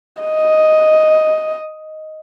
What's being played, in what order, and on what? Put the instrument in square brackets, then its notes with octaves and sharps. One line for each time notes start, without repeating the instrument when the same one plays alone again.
[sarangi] D#5